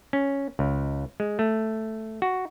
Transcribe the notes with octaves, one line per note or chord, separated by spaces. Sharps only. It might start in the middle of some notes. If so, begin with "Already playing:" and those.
C#4
C#2
G#3
A3
F#4